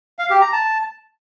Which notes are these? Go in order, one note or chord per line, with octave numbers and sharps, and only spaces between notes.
F5
G4
A#5
A5